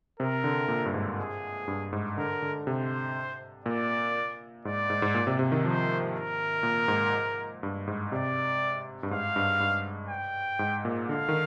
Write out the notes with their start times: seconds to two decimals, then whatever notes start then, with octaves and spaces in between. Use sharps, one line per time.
0.19 C3 A#4
0.44 D3
0.68 A#2
0.85 G2
0.94 G#2
1.19 G#4
1.68 G2
1.93 G#2
2.18 D3 A#4
2.42 D3
2.67 C3 C5
3.65 A#2 D5
4.65 G#2 D5
4.90 G#2
5.02 G#2
5.14 A#2
5.27 C3
5.39 C3
5.52 D#3
5.64 F3 C5
6.13 A#4
6.63 A#2
6.88 G#2
7.63 G2
7.87 G#2
8.12 C3 D5
9.03 G2
9.11 G#2 F5
9.36 G2
9.60 G2
10.09 G5
10.59 G#2
10.85 A#2
11.08 D3 F5
11.29 D#3